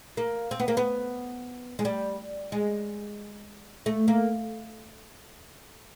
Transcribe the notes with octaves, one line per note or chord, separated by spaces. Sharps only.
A#3
C4
B3
A#3
B3
G#3
G3
G#3
A3
A#3